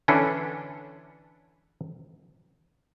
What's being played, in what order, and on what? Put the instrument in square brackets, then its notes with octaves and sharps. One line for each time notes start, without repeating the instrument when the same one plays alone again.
[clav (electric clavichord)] D3 E3 C#4 D4 A4 B4